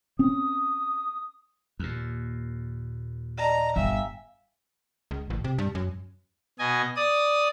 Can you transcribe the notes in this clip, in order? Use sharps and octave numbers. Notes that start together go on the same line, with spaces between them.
C4 C#4 D#6
D#2 A#2
D5 D#5 A5 A#5
G1 E5 F5 G5 G#5
C#2
A1
C3
G2
F#2
B2 D#5 G#5
D5 D#6